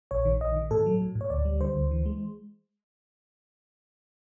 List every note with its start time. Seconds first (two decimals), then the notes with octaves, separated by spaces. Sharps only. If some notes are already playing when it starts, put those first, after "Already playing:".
0.11 A#1 C#5
0.25 D#3
0.41 A#1 D#5
0.56 D#3
0.71 A2 A4
0.86 F#3
1.01 A2
1.15 A2
1.21 C#5
1.30 D2 D5
1.45 G3
1.61 D3 C5
1.76 D2
1.91 E3
2.06 G#3